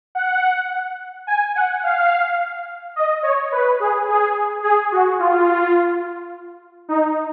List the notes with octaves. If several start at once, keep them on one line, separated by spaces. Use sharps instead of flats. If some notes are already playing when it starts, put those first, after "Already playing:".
F#5
G#5
F#5
F5
D#5
C#5
B4
G#4
G#4
G#4
F#4
F4
D#4